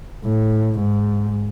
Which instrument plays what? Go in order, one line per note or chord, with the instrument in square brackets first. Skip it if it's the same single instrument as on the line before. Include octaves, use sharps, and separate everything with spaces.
[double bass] A2
G#2